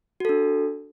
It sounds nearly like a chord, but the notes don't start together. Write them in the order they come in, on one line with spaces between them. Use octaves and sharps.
F#4 A4 D4